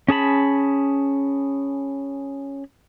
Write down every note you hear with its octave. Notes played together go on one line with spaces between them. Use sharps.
C#4 G#4 A5 B5